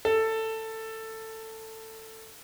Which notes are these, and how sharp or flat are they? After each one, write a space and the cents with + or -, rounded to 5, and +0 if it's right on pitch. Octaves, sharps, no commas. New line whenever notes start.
A4 +15